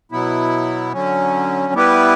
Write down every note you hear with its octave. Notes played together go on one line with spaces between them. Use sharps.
B2 F#3 B3 E4
D3 F#3 C#4
G3 B3 E4 G4 B4